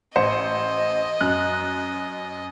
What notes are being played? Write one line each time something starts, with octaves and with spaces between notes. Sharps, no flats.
A1 C5 D#5 C#7
F#2 F#6